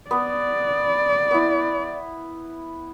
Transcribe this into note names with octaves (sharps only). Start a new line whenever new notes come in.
B3 D5
B3 E4